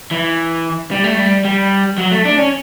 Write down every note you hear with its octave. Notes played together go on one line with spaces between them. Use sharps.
E3
G3
A3
G3
G3
F#3
A3
D4
C#4